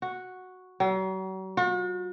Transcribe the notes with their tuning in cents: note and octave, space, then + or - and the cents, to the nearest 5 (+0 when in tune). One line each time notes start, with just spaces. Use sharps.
F#4 -5
F#3 +40
F#4 -45